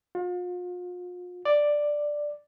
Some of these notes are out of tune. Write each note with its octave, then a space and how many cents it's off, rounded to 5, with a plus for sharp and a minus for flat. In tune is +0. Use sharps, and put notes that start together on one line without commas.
F4 +40
D5 +5